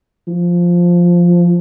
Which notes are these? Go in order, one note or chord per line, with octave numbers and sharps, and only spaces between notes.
F3